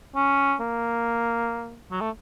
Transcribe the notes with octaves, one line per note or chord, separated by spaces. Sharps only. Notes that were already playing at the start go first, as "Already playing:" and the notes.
C#4
A#3
F#3
A3